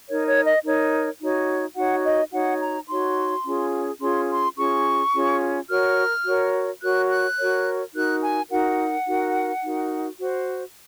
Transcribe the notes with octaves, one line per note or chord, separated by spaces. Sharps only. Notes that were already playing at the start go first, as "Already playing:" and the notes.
D#4 A#4 C#5
C#5
D#5
D#4 A#4 C#5
D#4 F#4 C#5
D#4 F#4 C#5 F#5
D#5
D#4 F#4 C#5 F#5
A#5
D#4 F#4 C#5 C6
C#4 F4 G#4
C#4 F4 G#4 C6
C6
C#4 F4 G#4 C#6
C#4 F4 G#4
F#4 A#4 C#5 F6
F#4 A#4 C#5
F#4 A#4 C#5 F#6
F#6
F#4 A#4 C#5
D#4 F#4 A#4 F#6
G#5
D#4 F#4 A#4 F#5
D#4 F#4 A#4
D#4 F#4 A#4
F#4 C5